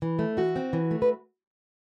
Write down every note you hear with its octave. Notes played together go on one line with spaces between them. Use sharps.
E3
A3
E3 F#4
C4
E3
A3
B4